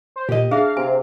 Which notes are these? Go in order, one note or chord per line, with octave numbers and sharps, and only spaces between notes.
C5
A#2 G4 D#5
D4 G#4 E5 F5
C3 G#5